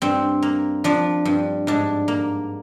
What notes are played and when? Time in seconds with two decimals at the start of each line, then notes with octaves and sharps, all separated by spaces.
0.02 G2 C4
0.42 A#3
0.84 F3 D4
1.25 G2
1.67 G#2 D4
2.08 A#3